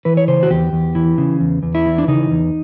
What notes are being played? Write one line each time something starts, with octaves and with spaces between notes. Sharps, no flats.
E3 B4
C#5
C#3 C5
F#4
E2 G4
E2
E3
C#3
E2
E2
E4
E3
D4
C#3 D#4
E2